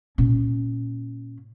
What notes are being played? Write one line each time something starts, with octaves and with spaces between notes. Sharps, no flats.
A#2 C#4